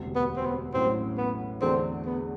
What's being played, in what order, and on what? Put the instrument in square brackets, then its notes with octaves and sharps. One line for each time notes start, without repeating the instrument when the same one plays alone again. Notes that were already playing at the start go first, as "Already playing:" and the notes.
Already playing: [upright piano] E1 D2 C3
[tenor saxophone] B3
C4
B3
[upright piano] A1 A2 F#3 [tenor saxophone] C4
[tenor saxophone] B3
[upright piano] E2 D3 A3 D4 F#4 [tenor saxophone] C4
[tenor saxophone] B3